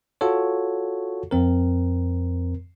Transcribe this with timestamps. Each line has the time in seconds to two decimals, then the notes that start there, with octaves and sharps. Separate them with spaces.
0.21 F4 F#4 A4 C#5
1.31 F2 C4 A#4